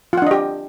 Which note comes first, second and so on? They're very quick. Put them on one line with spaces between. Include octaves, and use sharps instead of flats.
F4 F#5 D4 D#5 G4